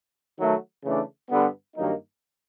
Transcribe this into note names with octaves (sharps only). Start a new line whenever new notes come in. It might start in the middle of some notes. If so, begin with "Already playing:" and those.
D#3 F#3 A3
C#3 E3 A3 D4
G2 D3 G3 B3
G2 D#3 F#3 A#3 D#4